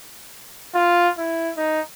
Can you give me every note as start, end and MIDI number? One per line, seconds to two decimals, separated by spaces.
0.74 1.09 65
1.18 1.51 64
1.57 1.80 63